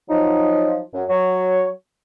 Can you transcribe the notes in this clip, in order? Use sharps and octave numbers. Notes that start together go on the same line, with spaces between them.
F3 F#3 D#4
F#2
F#3 C#5